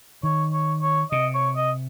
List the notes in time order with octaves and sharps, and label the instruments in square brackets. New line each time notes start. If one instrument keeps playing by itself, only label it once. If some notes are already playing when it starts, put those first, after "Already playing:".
[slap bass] D#3 [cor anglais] C#5
[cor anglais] C#5
C#5
[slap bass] C3 [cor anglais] D#5
[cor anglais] C#5
D#5